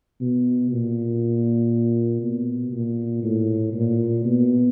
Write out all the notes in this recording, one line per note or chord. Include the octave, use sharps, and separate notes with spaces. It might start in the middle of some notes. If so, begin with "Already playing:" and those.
B2
A#2
B2
A#2
A2
A#2
B2